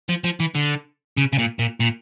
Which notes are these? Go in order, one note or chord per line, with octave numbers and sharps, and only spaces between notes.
F3
F3
E3
D3
C#3
C#3
A#2
A#2
A#2